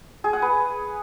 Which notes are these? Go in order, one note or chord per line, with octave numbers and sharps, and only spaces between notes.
G#4
F#5
B4